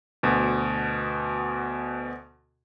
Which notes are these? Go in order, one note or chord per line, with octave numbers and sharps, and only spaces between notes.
D2 B2